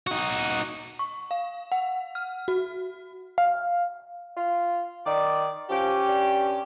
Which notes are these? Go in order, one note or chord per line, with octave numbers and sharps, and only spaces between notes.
D#4 F#4
C#6
F5
F#5
F6
F#4
F5
F4
D#3 D5
F3 C#4 G4
G2